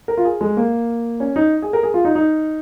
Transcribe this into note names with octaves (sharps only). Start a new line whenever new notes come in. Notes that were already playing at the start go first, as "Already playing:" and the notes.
A#4
F4
G#4
G#3
A#3
C#4
D#4
G#4
A#4
G#4
F4
D#4
D#4